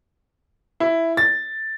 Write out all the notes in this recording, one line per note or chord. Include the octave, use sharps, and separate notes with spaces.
E4
A6